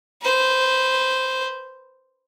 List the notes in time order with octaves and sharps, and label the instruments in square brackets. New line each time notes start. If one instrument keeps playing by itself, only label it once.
[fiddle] B4 C5